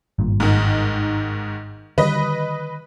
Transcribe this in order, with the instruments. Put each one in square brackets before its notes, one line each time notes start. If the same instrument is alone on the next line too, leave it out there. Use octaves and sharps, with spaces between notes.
[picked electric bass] G#1 G2 A#2
[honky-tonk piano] G#2 D#3
[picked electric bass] D3 D#3 G3 [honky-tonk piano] B4 D#5